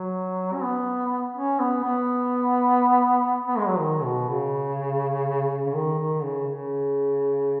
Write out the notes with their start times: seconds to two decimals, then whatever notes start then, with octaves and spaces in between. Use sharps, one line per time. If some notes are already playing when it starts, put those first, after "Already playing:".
Already playing: F#3
0.54 C#4
0.63 B3
1.35 C#4
1.60 B3
1.84 B3
3.47 B3
3.58 G#3
3.68 F#3
3.79 D#3
4.03 B2
4.29 C#3
5.67 C#3
5.75 D#3
5.99 D#3
6.23 C#3
6.48 C#3